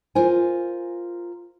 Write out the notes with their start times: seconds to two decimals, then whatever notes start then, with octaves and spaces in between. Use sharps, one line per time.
0.15 F4 A#4 C5 G#5